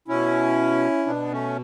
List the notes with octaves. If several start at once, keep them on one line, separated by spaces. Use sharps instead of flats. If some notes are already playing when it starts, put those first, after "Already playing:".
B2 C#4 E4
B2 B3 D4
A3 C#4